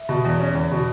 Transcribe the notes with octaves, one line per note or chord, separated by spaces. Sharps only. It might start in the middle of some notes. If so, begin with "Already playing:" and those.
Already playing: E5
B2
E2
C#4
E2
B2